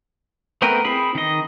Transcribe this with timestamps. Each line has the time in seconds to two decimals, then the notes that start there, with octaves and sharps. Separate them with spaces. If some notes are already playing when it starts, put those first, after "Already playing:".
0.62 A3 B3 C4 A#4 B4
0.85 C4 E4 G#4 B5
1.15 D#3 D#5